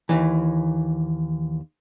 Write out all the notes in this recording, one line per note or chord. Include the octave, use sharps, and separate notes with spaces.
D#2 E3